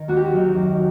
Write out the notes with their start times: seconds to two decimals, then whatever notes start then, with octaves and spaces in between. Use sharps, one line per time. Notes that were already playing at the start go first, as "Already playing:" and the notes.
Already playing: D#3
0.08 D#2 F#4
0.17 G4
0.25 F#4
0.32 D#3 F#3
0.55 F#2